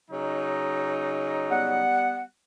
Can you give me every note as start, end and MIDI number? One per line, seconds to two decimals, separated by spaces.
0.11 1.85 49
0.11 1.85 54
0.11 1.85 63
1.51 2.23 55
1.51 2.23 59
1.51 2.23 78